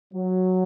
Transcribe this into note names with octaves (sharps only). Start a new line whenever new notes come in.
F#3